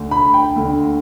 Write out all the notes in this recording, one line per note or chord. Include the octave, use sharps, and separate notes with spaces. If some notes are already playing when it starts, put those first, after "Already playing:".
Already playing: D2 D3
B5
G5
D2 D3